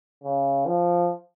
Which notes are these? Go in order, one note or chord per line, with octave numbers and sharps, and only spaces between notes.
C#3
F3